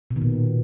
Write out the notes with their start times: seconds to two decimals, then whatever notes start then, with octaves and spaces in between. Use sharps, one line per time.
0.11 B2
0.16 D#3
0.22 A#2